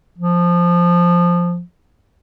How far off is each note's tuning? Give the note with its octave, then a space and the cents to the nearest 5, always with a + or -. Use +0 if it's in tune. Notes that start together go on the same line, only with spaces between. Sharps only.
F3 +0